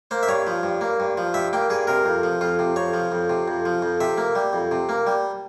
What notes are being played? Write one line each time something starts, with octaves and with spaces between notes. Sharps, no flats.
A#3 C5
E5
G2 C#5
F3
G2
A#3
G2
F3
G2 E5
A#3 G5
G2 G#4
C3 A#4
F2
F3
F2 F4
C3
F2 C#5
F3
F2
C3
F2
F3
F2
C3 E5
A#3
G3
F2
C3
A#3
G3